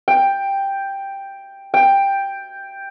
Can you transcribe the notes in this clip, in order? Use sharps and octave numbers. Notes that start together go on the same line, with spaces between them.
G5
G5